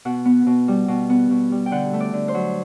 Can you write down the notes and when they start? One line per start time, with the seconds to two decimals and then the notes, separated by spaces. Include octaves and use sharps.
0.05 B2 F#5
0.25 B3
0.46 B2
0.68 G3
0.88 B2
1.10 B3
1.31 B2
1.52 G3
1.66 G5
1.71 D3 F#5
1.93 A3
2.00 D5
2.13 D3
2.28 C5
2.34 F#3